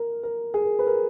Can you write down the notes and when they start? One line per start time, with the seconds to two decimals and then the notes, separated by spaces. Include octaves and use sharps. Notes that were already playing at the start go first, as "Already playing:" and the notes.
Already playing: A#4
0.23 A#4
0.54 G#4
0.64 A#4
0.79 B4
0.87 A#4